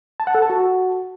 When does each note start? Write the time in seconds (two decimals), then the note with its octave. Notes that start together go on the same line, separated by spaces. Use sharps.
0.20 A5
0.27 F#5
0.35 A4
0.42 A5
0.50 F#4